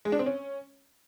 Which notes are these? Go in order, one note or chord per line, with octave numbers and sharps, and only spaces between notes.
G#3
D4
C4
C#4